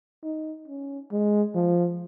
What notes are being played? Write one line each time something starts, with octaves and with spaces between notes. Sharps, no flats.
D#4
C#4
G#3
F3